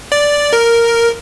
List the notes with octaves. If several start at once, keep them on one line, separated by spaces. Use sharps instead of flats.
D5
A#4